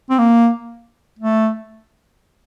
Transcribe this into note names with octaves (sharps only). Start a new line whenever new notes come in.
C4
A#3
A3